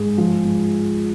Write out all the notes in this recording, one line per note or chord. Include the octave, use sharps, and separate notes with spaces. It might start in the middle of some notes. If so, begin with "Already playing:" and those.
Already playing: G#2 G#4
F3
G#2